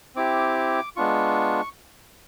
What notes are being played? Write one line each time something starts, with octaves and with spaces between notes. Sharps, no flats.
C4 E4 G4 D6
G#3 B3 D4 F4 C#6